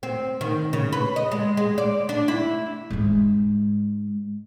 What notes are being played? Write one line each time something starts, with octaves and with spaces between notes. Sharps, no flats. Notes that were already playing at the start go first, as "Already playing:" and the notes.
C4
D#3
C#3
B4
D#5
G#3
G#3
D5
D4
E4
G#2 G#3